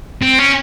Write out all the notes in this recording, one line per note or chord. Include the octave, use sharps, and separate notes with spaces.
C4
C#4